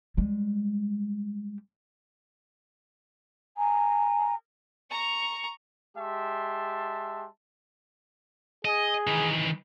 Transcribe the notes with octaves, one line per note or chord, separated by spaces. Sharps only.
G3 G#3
G#5 A#5
A#5 C#6
G#3 G4 E5 A5 C6
G#4 D#5
D#3 E3